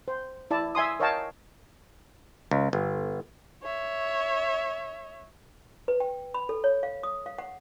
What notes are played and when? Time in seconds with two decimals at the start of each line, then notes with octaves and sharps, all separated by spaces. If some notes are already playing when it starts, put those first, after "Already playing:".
0.08 C5
0.51 E4 D5 A5
0.75 E5 G#5 C6 D#6
1.00 A#4 C#5 D#5 F5 G5 A5
2.51 C#2
2.73 G1
3.63 C#5 E5
5.88 B4
6.00 G5
6.34 B5
6.49 A4
6.64 C#5
6.83 F5
7.03 D#6
7.26 F5
7.38 F#5